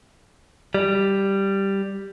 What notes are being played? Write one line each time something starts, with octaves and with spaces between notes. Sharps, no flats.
G3